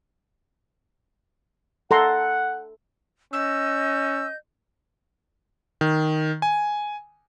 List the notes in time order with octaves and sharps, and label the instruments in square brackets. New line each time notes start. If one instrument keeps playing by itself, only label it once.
[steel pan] A4 A#5 C6 [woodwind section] F#5
[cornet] C#4 [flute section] D#5 G6 [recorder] E6
[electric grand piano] D#3
G#5